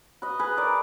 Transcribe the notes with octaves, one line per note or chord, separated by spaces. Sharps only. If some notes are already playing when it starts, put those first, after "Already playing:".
B4 D#5
G#4 B4
A#4 D5